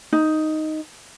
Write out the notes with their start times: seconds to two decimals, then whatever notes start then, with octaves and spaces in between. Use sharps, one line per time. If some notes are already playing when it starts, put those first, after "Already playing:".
0.13 D#4